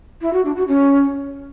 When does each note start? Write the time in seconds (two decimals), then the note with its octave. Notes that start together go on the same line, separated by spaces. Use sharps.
0.21 E4
0.33 F#4
0.44 D4
0.56 F#4
0.67 C#4